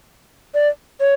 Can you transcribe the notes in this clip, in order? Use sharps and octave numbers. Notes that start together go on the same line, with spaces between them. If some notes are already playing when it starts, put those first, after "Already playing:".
D5
C#5